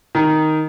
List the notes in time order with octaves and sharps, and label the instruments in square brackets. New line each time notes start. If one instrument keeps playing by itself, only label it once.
[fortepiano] D#3